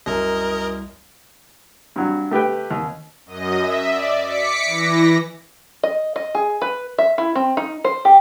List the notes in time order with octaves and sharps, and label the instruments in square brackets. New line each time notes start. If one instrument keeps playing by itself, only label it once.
[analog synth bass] C2 [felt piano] F#2 [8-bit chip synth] A#4 D#5
[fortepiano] G2 F#3
A3 G4 B4 G5
D#2
[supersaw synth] F#2 D#5
E5
D5
D6 B6 C#7
E3 A#6
[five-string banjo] D#5
D#5
G#4
B4
E5
E4
C4
D#4
C5
G4